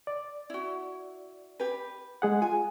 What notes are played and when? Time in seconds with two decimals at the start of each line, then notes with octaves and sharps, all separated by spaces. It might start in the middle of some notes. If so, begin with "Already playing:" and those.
0.07 D5
0.50 E4 F#4
1.60 G4 B4
2.22 G#3 G#4 F#5
2.42 F4 G#5